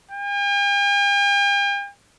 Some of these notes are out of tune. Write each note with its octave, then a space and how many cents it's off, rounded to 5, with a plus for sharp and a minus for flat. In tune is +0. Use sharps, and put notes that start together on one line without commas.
G5 +45